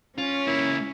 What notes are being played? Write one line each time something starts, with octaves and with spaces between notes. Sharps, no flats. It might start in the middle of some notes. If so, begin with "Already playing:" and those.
C#4 F4
C#2 A#3 E4